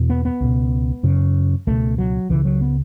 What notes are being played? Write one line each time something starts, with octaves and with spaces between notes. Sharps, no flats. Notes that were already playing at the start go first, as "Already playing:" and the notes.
Already playing: E2 B2
B3
B3
C#2 B2
F#2 C#3
C#2 B2 A3
F#3
C#2 C#3 E3
F#3
B3